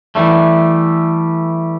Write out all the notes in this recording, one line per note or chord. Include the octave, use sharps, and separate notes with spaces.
E3 G3 A3